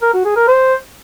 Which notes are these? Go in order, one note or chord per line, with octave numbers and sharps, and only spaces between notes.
A#4
F#4
G#4
A#4
C5